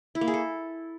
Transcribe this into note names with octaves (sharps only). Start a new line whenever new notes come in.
E4
A#3
G#4
A4